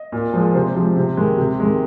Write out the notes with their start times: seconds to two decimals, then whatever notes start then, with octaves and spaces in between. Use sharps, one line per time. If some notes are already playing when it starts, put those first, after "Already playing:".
Already playing: D#5
0.12 A#2
0.34 F3 G#3
0.55 C3 C5
0.75 F3 G#3
0.96 C3
1.17 D#3 G#3
1.38 C3
1.60 D#3 G#3